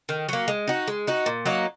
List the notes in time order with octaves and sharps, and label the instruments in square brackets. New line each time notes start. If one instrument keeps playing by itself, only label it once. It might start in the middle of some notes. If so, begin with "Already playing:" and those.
[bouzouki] D#3
F#3 A#3
G#3
D#4 F#4
G#3
D#4 F#4
A#2
F#3 A#3 D#4